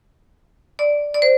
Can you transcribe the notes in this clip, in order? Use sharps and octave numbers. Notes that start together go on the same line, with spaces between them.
D5
D5
C5